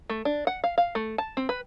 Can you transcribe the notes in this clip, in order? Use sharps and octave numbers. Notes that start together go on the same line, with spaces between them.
A3
D4
F#5
F5
F5
A3
A5
C4
B4